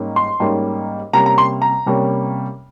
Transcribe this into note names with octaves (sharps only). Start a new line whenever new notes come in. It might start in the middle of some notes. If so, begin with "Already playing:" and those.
Already playing: G#2 G3 A#3 C#4
C6
G#2 G3 A#3 C#4
C3 G3 A#3 C#4 A#5
A#5
C6
A#5
C3 G3 A#3 C#4